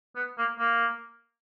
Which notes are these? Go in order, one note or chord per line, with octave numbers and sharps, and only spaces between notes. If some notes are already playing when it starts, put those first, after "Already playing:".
B3
A#3
A#3